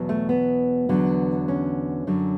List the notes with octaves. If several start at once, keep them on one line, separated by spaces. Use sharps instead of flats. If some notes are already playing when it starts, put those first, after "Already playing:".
Already playing: E2 B2 F#3
A3
B3
E2 D3 F#3
C#4
F#2 D3 F#3